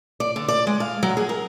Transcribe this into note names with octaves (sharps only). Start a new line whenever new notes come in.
D5
D3
D5
G#3
F5
F#3
G#4
A#4